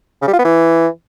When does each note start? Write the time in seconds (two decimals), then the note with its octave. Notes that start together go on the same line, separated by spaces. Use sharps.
0.22 C#3
0.28 G3
0.33 F4
0.39 B3
0.44 E3